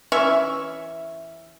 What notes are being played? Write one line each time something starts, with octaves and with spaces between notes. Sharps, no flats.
E3 C#4 E5 C#6